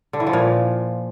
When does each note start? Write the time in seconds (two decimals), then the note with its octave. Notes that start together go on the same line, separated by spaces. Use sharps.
0.13 D3
0.20 E3
0.27 F3
0.33 A#2